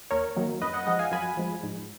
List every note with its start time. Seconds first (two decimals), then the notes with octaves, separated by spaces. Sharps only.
0.11 D#2 A#4 C#5
0.36 D#3 F#3 A#3
0.62 F#2 B4 D#5
0.74 D#5 F#5
0.87 F3 G#3 D#5 F#5
0.99 F5 G#5
1.12 F#2 G#5 B5
1.37 F3 G#3
1.63 G#2